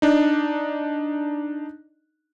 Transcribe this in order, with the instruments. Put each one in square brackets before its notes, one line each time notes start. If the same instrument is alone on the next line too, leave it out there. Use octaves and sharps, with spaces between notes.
[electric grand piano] D4 D#4